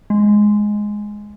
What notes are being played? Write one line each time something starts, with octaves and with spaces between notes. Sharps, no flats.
G#3